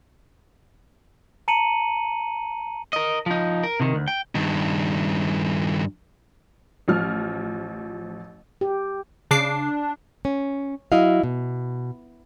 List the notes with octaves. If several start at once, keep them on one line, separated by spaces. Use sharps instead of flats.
A5 A#5 C#7 D#7 F#7
A#4 D#5
F3 D#4
A#4
C3 D#3
D2
G5
G2 D#3
A1 F3 F6
G4
C#3 D4 D6 C7
C#4
F#3 E4 F#4 D#5 F5
B2